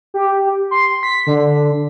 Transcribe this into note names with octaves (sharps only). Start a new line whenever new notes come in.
G4
C6
B6
D3